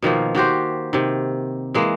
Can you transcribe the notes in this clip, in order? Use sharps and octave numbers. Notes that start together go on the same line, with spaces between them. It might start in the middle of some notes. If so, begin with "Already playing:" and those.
B2 D#3 F3 A#3
D#3 F#4 G4 C5
C3 D#3
E3 G#3 A#3